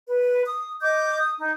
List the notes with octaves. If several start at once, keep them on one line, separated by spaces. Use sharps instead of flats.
B4
D#6
D#5 D6 G6
D#6
D#4